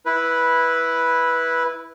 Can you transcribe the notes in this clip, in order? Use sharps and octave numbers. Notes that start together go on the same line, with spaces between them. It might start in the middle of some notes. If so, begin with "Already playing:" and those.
E4 B4